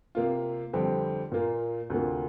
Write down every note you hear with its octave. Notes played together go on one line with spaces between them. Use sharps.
C3 A#3 F4
F2 D3 G3 C4 G4
A#2 A#3 F4
D2 C3 A#3 F4